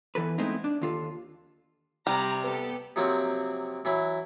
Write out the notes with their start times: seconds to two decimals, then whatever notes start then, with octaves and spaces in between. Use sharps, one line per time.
0.15 E2 E3 A4 B4
0.38 G#3 A3 B3 C4 D#4 E4
0.64 D4
0.82 D#2 F4 A4
2.07 C3 G3 A#5
2.44 B3 G4 A4 B4
2.96 C3 F3 F#3 A#3 C4
3.85 E3 F#3 E4